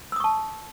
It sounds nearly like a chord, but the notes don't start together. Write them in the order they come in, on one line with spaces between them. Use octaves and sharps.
E6 D#6 C#6 A5